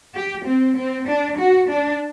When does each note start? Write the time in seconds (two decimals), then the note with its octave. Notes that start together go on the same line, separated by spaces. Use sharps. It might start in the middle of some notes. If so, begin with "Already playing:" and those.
0.15 G4
0.46 C4
0.77 C4
1.08 D4
1.38 F#4
1.70 D4